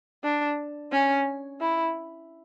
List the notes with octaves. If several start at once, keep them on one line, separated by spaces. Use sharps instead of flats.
D4
C#4
E4